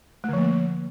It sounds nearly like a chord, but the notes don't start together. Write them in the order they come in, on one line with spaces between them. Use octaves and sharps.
A3 D3 F3 A#3